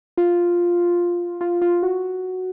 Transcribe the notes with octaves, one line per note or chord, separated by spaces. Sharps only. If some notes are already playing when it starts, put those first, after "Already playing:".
F4
F4
F4
F#4